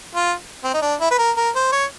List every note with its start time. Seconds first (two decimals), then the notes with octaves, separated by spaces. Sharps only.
0.15 F4
0.64 C4
0.74 D#4
0.82 D4
1.00 E4
1.11 B4
1.19 A#4
1.37 A#4
1.55 C5
1.72 C#5